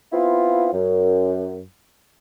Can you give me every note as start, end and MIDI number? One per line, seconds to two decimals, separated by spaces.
0.12 0.69 59
0.12 0.69 60
0.12 0.69 64
0.12 0.69 65
0.72 1.63 42